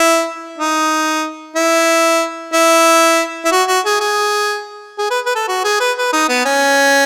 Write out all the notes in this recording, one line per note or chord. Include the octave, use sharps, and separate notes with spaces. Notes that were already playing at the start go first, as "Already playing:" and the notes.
Already playing: E4
D#4
E4
E4
E4
F#4
F#4
G#4
G#4
G#4
B4
B4
A4
F#4
G#4
B4
B4
D#4
B3
C#4